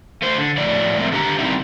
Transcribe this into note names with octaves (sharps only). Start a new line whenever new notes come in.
A3 C5
D3
A2 F3 F#3 A3 D5
F3 G#3 A3 C4 A#4 E5
D3 G4 A#5
C3 D#3 G3 C4 D#4 E4